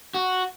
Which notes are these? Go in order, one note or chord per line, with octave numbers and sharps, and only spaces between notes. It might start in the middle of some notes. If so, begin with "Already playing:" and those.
F#4